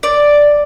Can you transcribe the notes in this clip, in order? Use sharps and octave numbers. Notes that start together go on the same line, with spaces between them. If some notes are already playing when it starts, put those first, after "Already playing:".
D5